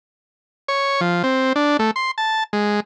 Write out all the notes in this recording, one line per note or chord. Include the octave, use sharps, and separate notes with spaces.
C#5
F3
C4
D4
A3
C6
A5
G#3